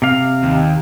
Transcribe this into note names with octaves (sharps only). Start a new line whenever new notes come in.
C3 F5
D#2